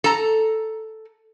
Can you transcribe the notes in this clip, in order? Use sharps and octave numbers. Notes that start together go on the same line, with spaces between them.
A4 A#5